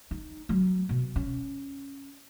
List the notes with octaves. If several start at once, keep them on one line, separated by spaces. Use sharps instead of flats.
D#4
F#3
B2
C#4